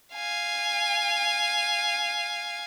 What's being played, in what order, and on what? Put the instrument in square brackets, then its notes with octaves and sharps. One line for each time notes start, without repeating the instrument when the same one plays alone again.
[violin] F5 G#5